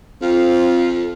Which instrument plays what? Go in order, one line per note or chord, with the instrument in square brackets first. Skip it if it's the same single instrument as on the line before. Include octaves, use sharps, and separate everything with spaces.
[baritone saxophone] F2 [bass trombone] C4 [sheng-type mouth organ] F4 F5